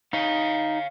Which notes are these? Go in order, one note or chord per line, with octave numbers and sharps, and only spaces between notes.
D#4 C#5 F5